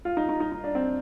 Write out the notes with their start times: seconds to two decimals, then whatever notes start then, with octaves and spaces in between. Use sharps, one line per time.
0.05 F4
0.17 D#4
0.29 D#4
0.40 D#4
0.52 D#4
0.64 D4
0.75 C4